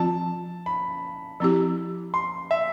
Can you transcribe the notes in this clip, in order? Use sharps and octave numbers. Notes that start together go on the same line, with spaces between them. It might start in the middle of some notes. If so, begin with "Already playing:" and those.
Already playing: F3 C4 F4 A5
B5
F3 C4 E4 G4
C6
E5